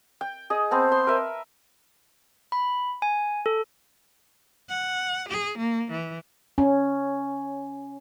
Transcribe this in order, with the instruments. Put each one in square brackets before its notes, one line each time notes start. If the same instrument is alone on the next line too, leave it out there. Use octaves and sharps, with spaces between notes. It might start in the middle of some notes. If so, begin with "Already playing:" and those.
[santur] G5
G#4 D#5
[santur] B3 C4 A5 [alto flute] C5
[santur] C6
A#4 B4 E5
[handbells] B5
G#5
A4
[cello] F#5
G#4
A#3
E3
[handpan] C#4